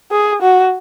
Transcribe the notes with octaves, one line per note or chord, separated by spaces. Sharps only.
G#4
F#4